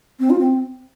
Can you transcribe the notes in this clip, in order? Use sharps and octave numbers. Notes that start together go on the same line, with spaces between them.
C4
F4
C4